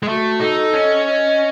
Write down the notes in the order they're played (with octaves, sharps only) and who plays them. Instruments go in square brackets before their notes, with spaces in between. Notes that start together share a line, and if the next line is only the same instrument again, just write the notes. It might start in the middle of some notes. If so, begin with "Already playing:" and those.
[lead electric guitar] G#3
[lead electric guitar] A3 [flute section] F#4
[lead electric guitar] D#4 [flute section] A4
[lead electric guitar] C#4 [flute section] D#5
[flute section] D#5